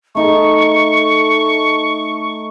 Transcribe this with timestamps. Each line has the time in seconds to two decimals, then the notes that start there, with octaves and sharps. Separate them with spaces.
0.15 A3 D#4 A4 C#6